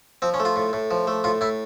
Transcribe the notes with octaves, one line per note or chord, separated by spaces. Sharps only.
F3 C4
C#4
A3
F4
A2
A2
F3
A3
A2 F4
A2 E4